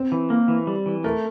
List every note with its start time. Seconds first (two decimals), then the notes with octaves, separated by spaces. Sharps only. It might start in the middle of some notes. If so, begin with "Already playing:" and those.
Already playing: C4
0.12 E3
0.30 A#3
0.48 E3
0.67 G3
0.86 E3
1.04 A3 A#4